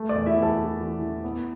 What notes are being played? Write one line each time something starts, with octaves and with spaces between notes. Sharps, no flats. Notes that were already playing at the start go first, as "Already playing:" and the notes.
Already playing: A3
D5
E2
E4 E5
E2
A4 A5
E3
E3
E3
B3